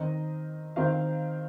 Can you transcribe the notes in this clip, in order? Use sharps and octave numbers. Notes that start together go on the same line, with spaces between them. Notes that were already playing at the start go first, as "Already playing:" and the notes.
Already playing: D#3 C4 D#5
D#3 C4 F5